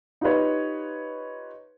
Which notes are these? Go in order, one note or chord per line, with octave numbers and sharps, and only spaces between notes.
D#4 F4 G4 B4 C#5